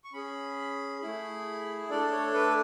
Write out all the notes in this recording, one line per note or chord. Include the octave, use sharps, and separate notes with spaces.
C#6
C#4 G#4 B5
A3 E4 G#4
A3 D4 A4 D5
C#5
B4